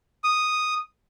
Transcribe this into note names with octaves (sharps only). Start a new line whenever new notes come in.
D#6